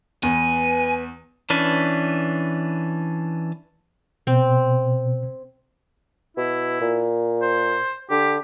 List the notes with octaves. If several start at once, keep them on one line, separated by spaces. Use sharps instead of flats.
E2 B4 G#5
E3 C#4 D4 B4
B2 C4
B2 E4
A#2
C5
D3 G4